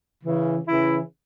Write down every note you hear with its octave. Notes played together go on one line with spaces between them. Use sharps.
C#3 E3
C#3 E3 E4